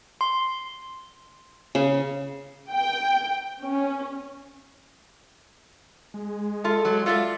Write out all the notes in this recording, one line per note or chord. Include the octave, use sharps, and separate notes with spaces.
C6
C#3
G5
C#4
G#3
F4 A4 E5
F#3
F4 A4 D5 E5